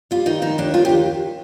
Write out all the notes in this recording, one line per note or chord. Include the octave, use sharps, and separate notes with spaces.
G3 F4
D#3 D#4
D#3 D#4
D#2 D4
D#2 F4
D#3 G4